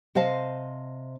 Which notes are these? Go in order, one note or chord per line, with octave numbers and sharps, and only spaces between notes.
C3 C5 D#5 F5 A5